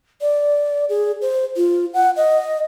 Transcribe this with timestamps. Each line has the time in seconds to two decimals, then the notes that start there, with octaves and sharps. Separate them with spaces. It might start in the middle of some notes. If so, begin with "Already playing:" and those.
0.21 D5
0.89 G#4
1.22 C5
1.57 F4
1.94 F#5
2.16 D#5